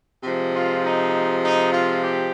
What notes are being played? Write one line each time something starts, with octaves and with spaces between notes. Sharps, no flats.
C3 F3 G#3
F4
D#4
D#4
F4
G4